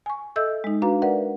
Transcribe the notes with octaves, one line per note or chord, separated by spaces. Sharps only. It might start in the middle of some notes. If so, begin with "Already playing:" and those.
G#5 C#6
A4 D#5 E5 E6 G6
G#3 D#4
D4 F#4 B4 F5 A#5
A#4 B4 D5 E5 F#5